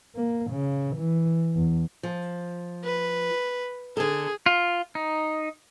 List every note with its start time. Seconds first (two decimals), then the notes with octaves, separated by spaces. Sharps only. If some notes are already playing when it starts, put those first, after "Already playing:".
0.16 A#3
0.51 C#3
0.96 E3
1.55 E2
2.03 F3
2.84 B4
3.97 D3 G#4 A4
4.46 F4
4.95 D#4